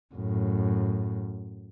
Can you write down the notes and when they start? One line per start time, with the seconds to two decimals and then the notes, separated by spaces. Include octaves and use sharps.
0.15 F#2 A2